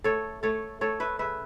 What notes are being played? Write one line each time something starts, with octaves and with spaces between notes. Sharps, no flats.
A3 A4 C#5
A3 A4 C#5
A3 A4 C#5
B4 E5
C#3 B4 E5